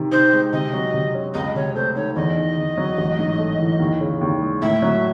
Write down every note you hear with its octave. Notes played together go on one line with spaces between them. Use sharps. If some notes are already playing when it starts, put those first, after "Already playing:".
Already playing: C3 D#3
D#4 C5
G#3
C3 D#5
F#3
C3
C#4
C#2 D#5
C3 C#5
A3 C5
D#3 C#5
E2 D#5
D#3
E2
F#3
A1
G#2
A3
E3
D#2
C#3
D#2
G#3
A2 E5
F#3